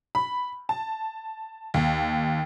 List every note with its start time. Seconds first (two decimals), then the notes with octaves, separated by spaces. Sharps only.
0.15 B5
0.69 A5
1.74 D#2